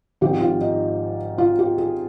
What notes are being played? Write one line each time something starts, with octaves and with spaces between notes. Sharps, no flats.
G#1 G#2 F3 G4
F4
D#4
F4
G4
G#4